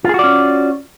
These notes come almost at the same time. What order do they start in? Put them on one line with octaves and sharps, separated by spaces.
F4 G#4 F#4 D5 C#4